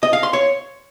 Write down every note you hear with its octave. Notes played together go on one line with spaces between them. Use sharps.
D#5
F5
C6
C#5